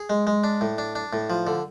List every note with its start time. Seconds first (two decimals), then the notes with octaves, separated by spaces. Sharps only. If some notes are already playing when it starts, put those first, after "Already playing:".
Already playing: G#4
0.10 G#3
0.27 G#3
0.44 D4
0.61 A2
0.78 D4
0.95 D4
1.13 A2
1.30 F3
1.47 D3